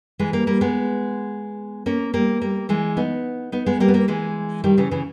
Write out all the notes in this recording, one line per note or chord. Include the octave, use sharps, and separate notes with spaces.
E3 G#3
G3 A#3
G3 A#3
G#3 B3
A#3 C#4
G3 A#3
G3 A#3
E3 G#3
B3 D#4
B3 D#4
G#3 B3
G3 A#3
B3
G3 A#3
E3 G#3
D#3 G3
C#3 E3
C#3 E3